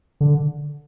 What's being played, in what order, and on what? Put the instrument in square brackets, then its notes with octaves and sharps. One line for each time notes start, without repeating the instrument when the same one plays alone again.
[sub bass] D3